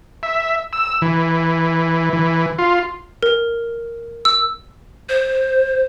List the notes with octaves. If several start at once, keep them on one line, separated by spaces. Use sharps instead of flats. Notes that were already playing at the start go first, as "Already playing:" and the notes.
E5
E6
E3
E3
F4
A#4
E6
C5